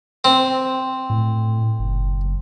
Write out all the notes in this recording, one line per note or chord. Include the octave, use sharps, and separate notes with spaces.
C4
A2
F#1